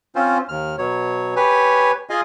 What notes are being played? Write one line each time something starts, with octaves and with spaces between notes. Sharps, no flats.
C4 C#4 F4 C5
D#2 F6
B2 F#3 C#5
G4 B4 C#5 G#5
F4 G#4 D#5 F5 G#5